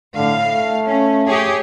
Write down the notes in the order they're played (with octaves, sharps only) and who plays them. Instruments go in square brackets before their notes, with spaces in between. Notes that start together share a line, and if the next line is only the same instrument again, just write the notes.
[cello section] A2 F5 [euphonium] D3
[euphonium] A3
[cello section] C#4
G4 G#4 C#5